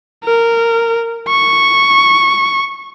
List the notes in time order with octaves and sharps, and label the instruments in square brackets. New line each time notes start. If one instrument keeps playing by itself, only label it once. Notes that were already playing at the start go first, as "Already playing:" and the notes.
[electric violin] A#4
C#6